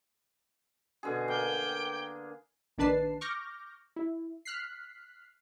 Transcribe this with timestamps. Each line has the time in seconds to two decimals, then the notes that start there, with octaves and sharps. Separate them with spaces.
1.03 B2 D3 G#4
1.28 A#3 G5
2.78 A#1 D#3 D4 B4 A5 C7
3.21 C#6 D6 F6 G6 A#6
3.96 E4
4.45 F6 F#6 B6 C7